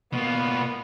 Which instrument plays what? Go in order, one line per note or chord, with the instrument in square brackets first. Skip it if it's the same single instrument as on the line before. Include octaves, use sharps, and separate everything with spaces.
[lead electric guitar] B2 A#3 [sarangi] B3